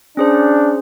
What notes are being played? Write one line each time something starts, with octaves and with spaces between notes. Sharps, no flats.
C#4 D4 G#4 C5